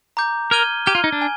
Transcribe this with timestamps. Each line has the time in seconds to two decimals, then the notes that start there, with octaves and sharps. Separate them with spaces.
0.17 A#5 D6 G6
0.51 A#4 F6 G#6 D#7 G7
0.86 G4 F6 G#6 D#7 G7
0.95 F4
1.04 D#4
1.12 D4
1.22 G#5